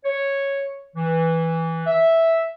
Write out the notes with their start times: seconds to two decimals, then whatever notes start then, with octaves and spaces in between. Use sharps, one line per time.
0.05 C#5
0.96 E3
1.86 E5